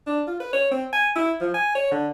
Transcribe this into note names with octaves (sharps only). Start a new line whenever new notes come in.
D4
F4
B4
C#5
C4
G#5
E4
F3
G#5
C#5
D3